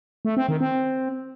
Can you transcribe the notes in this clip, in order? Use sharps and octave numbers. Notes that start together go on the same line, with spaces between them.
A3
C4
D#3
C4